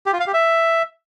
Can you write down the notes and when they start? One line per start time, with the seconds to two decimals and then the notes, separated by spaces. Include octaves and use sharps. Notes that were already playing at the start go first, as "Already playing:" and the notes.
0.06 G4
0.13 F4
0.20 F5
0.27 G4
0.34 E5